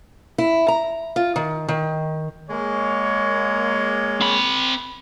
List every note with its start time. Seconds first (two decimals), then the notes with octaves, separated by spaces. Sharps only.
0.38 E4
0.68 A#5
1.16 F4
1.36 D#3
1.68 D#3
2.50 G#3 A#3 C#5
4.21 C4 B5